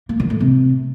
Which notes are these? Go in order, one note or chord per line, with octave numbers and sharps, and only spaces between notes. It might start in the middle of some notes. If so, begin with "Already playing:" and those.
A#3
D#3
A2
C3